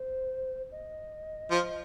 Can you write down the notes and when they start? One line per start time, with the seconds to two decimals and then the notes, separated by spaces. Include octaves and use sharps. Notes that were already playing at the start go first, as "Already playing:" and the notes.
Already playing: C5
0.72 D#5
1.51 F3